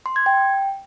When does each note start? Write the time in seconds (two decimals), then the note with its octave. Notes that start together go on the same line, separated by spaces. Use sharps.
0.06 C6
0.16 G#6
0.26 G5